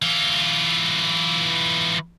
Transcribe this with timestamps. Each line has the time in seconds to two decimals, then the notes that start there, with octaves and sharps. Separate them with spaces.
0.02 E3 F4